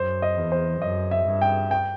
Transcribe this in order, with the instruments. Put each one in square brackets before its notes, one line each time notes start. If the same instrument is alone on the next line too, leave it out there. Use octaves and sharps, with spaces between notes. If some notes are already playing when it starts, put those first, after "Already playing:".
Already playing: [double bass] F#2 [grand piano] C5
[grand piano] D#5
[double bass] E2
[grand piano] C5
[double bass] F#2 [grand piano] D#5
[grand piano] E5
[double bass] G2
[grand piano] G5
G5